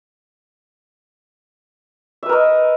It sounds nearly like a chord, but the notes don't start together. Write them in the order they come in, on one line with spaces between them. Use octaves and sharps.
E5 B4 A#4 D#5